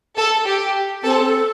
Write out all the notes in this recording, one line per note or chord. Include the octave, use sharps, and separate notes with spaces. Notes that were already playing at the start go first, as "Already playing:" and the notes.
A4
G4
C4 A4
A4